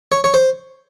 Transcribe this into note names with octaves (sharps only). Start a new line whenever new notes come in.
C#5
C#5
C5